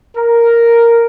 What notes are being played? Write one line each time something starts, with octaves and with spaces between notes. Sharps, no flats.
A#4